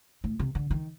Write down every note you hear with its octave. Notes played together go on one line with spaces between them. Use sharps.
A2
C3
D3
D#3